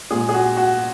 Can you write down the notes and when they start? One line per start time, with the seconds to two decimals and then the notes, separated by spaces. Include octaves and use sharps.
0.11 A#2 G#3 G#4
0.29 G#4
0.34 F#4
0.57 F#4